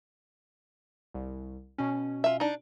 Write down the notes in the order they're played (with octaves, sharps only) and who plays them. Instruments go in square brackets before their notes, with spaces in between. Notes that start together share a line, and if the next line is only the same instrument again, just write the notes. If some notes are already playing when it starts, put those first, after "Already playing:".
[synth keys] C2
B2 C#4
[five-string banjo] F4 E5
D4 D#4